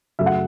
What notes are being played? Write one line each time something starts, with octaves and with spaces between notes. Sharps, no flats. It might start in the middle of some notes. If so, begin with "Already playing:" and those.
F#2 C#3 F#3 A3 E5
F#5